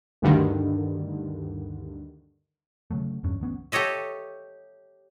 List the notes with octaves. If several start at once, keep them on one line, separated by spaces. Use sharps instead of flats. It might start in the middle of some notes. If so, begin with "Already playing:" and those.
D2 G2 D3 D#3
C#3 E3 F#3 A3
E2 G2 C#4
D1 A1 B3 C#4
G4 A4 C#5 D#5 E5